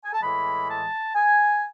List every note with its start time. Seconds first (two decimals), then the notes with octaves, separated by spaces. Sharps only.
0.05 G#5
0.13 A5
0.21 A2 E3 G#3 B5
0.68 A5
1.15 G#5